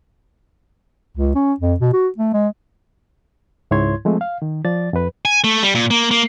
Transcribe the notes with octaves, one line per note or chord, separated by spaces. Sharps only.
C#2
C#4
F2
B2
F#4
A3
G#3
C#2 G#2 E4 C#5 C6 G#6
F3 G#3 A3 C4
F5
D#3
F3 D5 A6
F2 B4
G#5
A3
G3
A#2
A#3
A#3